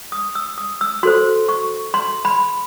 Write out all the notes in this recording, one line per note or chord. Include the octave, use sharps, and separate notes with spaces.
D#6
E6
D#6
E6
F#4 A4 C5 C6
C#6
C6
B5